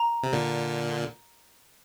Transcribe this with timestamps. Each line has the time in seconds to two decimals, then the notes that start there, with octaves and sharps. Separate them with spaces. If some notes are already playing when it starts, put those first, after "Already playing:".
Already playing: A#5
0.23 C3
0.33 A#2 D3